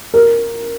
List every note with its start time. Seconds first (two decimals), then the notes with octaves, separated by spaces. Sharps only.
0.14 A#4